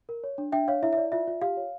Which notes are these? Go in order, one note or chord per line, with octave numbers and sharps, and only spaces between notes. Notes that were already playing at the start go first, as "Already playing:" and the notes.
A#4
C#5
D4
D4 E5 G5
C#5 F5
E4 E5
E5
D5
F4 E5
F4
G4 F5
C#5